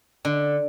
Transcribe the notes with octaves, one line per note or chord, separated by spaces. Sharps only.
D3